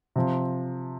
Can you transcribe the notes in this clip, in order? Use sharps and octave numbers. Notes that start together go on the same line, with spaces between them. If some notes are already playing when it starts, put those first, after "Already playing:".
C3 F3